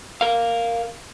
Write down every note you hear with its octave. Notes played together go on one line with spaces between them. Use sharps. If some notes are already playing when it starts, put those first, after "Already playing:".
A#4 F5